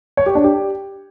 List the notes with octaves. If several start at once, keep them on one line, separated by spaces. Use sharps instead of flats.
C#5
G4
D4
G4